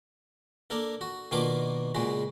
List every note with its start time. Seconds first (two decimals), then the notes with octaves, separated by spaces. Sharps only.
0.70 A#3 D4 A4 A#4
1.01 F#4
1.31 B2 D#3 A#3 D4 F4 D6
1.95 A#2 C#3 G#3 F#4